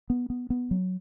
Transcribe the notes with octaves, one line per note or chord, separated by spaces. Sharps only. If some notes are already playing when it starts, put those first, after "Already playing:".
B3
B3
B3
F#3